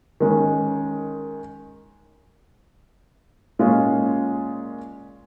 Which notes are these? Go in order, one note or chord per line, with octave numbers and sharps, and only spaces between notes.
D#3 G#3 C#4
A#2 G#3 C#4 F4